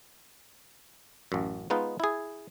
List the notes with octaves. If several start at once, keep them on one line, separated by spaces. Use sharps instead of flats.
A1 F#2
G#3 B3 D#4 F4 B4
E4 G#4